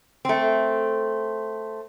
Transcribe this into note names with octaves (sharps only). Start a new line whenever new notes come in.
A3 C4